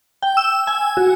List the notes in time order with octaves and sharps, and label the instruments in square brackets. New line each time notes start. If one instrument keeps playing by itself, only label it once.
[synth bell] G5
E6
G#5
F#4